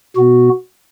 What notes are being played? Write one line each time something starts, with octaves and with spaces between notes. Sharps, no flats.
B2 B3 F#4